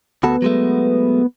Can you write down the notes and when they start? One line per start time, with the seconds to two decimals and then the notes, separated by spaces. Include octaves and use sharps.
0.23 D2 B3 F#4 A4
0.42 F#3 G#3 A3